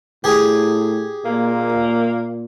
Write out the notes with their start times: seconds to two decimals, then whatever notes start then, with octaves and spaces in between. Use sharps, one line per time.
0.24 A2 G4 G#4
1.25 A#2 A#3